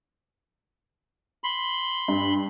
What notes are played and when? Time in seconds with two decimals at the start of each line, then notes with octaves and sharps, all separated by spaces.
1.44 B5 C6
2.08 G2